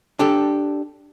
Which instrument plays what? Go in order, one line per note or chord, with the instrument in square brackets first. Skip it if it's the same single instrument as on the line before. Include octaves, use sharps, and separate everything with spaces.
[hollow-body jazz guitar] D4 G4 A4